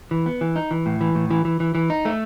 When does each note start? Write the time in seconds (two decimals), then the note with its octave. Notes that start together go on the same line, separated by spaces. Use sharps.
0.11 E3
0.26 B3
0.41 E3
0.56 D#4
0.71 E3
0.86 A2
1.01 E3
1.15 A2
1.31 E3
1.45 E3
1.60 E3
1.75 E3
1.90 D#4
2.05 A3